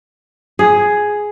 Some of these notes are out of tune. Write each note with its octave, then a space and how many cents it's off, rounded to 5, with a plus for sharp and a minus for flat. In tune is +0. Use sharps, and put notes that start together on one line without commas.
G#4 +5